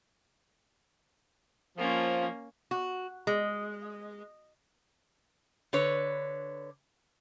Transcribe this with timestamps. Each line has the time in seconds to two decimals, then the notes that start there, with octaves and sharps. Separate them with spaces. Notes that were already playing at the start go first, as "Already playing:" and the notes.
1.78 F3 A#3 C#4
2.71 F#4
3.27 G#3
5.73 D3 B4 C#5